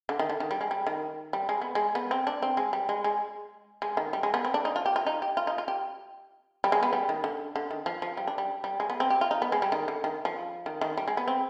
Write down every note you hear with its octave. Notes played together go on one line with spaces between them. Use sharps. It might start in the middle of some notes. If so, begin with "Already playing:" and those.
D3
D#3
D3
D#3
G3
G#3
G3
D#3
G3
G#3
B3
G#3
B3
C4
D4
C4
G#3
G3
G#3
G#3
G#3
D#3
G3
G#3
B3
C4
D4
D#4
F4
G4
F4
D#4
G4
F4
D#4
F4
G4
G3
G#3
B3
G3
D#3
D3
D3
D#3
F3
F3
G3
D4
G3
G3
G#3
B3
C4
G4
F4
D#4
B3
G#3
G3
D#3
D3
D#3
F3
D#3
D#3
G3
G#3
B3
C4